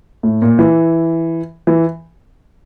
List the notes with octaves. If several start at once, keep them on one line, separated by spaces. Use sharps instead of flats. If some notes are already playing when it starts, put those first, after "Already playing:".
A2
A#2
E3
E3